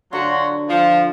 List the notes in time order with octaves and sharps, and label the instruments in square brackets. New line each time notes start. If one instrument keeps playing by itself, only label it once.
[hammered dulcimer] D3 [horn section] F#3 F4 F#4
[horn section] F3